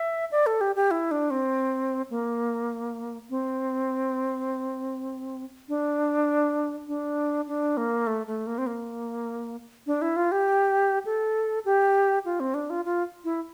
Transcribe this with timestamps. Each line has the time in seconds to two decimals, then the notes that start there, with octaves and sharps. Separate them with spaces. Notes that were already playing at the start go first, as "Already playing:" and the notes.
Already playing: E5
0.31 D5
0.46 A4
0.61 G4
0.76 G4
0.91 E4
1.11 D4
1.31 C4
2.10 A#3
3.30 C4
5.69 D4
6.88 D4
7.48 D4
7.77 A#3
8.07 A3
8.27 A3
8.47 A#3
8.58 C4
8.67 A#3
9.87 D4
10.02 E4
10.16 F4
10.32 G4
11.05 A4
11.65 G4
12.25 F4
12.40 C4
12.54 D4
12.70 F4
12.85 F4
13.24 E4